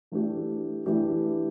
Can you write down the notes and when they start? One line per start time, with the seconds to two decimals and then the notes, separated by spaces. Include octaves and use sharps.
0.12 E3 A3 D4 G4
0.86 E3 A3 D4 G4